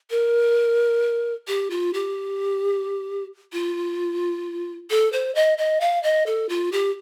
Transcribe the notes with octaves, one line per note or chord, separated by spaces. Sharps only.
A#4
G4
F4
G4
F4
A4
C5
D#5
D#5
F5
D#5
A4
F4
G4